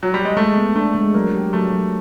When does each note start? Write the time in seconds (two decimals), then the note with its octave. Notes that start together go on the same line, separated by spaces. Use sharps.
0.03 F#3
0.14 G3
0.25 G#3
0.37 G#3 A3
0.57 B3
0.75 A3 D4
0.95 G#3
1.14 F#3 A#3
1.34 G4
1.53 F#3 A3
1.72 F#3